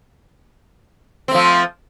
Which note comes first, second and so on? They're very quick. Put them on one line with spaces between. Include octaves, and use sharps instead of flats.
C4 A3 F3